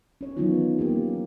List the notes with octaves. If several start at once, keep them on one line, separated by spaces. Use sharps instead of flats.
C#4 C#5
D#3 E3 F#3 B3 D#4 F4
A#3 C#4 G4